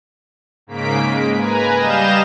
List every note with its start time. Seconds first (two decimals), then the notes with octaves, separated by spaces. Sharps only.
0.67 G#2 C#3 A#3 B6 D7
0.98 G#3
1.37 B4 G#5 A#5
1.75 G3 D#5 F5 G6 A#6 E7